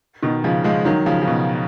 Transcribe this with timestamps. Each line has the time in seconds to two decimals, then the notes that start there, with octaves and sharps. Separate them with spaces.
0.23 B2 D#3
0.44 C#3 F3
0.64 F3 G#3
0.85 D#3 F#3
1.06 C#3 F3
1.22 C#3
1.27 B2 D#3